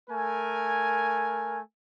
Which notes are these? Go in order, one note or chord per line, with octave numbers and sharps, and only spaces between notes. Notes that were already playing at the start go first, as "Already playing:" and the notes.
A3 A#4 G#5